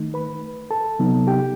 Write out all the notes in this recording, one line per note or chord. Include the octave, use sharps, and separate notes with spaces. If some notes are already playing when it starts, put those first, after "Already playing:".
Already playing: D#3 A3 D#4
B4 B5
A4 A5
C3 F#3 B3 D#4
G4 G5